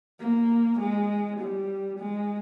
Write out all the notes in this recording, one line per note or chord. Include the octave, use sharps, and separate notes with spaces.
A#3
G#3
G3
G#3